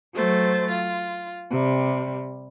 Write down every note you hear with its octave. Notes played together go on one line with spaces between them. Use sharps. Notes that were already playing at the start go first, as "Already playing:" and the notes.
F#3 A3 C5 A6
F4
C3 G3